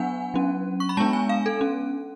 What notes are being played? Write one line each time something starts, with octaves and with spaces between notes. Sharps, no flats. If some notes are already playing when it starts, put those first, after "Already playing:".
Already playing: F#3 B3 D4 F#5 G#5
F#3 C#4
C#6
B5
G#3 B3 D4 A5
G#5
F5
A4
C#4